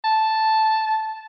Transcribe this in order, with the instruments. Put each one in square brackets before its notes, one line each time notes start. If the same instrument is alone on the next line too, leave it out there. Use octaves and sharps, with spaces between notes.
[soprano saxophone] A5